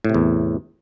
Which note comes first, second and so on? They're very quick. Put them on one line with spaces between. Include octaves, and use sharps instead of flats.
A2 C3 E2